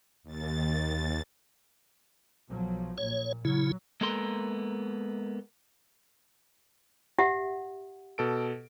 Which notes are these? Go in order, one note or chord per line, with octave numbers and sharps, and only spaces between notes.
D#2 A6
B1 F3 F#3
A#1 A#2 C#5
C#3 F#3 E4
G#3 A#3 B3 A4 A#4 C6
G4 E5 F#5
B2 A4 D7